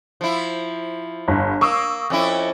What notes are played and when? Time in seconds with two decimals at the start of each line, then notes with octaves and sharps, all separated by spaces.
0.21 F3 E4
1.28 G1
1.61 A#3 C#6 D#6 E6
2.10 F2 C#4 E4